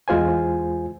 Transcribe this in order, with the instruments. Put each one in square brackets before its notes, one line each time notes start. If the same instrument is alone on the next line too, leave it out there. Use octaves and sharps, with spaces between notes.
[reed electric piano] E2 G#3 F4 C5 G#5